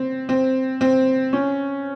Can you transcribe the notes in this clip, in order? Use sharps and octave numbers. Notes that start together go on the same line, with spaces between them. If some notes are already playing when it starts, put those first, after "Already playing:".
Already playing: C4
C4
C4
C#4